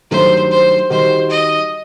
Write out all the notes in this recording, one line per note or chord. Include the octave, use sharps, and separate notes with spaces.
G2 D#3 F#3 A3 C5
C5
D#3 G3 D#4 F#4 C5
D#5